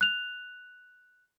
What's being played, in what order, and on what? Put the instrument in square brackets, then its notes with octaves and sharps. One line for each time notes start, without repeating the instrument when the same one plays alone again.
[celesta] F#6 F7